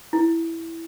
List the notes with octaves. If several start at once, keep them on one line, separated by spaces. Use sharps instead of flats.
E4